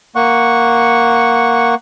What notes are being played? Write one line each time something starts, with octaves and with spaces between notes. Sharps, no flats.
A#3 F#5 C#6